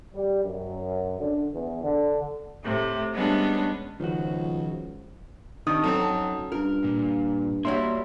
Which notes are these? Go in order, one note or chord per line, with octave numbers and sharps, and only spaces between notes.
G3
F#2
D3
E2
D3
A2 C3
G3 G#3 B3 C#4 D4
C#2 D#3 F3 F#4
C3 D#3 D4 D#4 D#6
F#3 C4 C#4 A4 A#5
G2 F4 A#4
A#2
F#3 G3 A#3 E4 C#5 C6